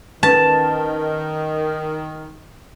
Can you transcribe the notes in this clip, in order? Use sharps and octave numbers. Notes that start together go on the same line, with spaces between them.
D#3 C#4 B4 A5